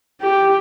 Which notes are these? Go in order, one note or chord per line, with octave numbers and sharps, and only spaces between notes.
G4